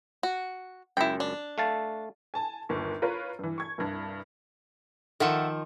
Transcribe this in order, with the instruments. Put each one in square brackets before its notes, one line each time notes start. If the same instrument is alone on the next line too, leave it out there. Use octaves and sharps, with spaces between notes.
[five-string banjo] F#4
[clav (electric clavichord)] C#2 F#2 [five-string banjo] E4 G5
[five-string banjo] D4
[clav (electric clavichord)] A3 F5 A5
[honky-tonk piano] G#5 A5
G1 D#2
F4 A#4 B4 C#5
G2 E3
C#6 G#6
C2 G2
[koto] D#3 F3 [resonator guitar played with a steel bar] A4 E5 F#5